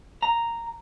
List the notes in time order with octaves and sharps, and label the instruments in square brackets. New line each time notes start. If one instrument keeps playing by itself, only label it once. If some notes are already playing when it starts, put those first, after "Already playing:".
[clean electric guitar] A#5